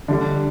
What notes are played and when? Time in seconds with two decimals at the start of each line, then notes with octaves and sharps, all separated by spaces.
0.08 D3 G3 D4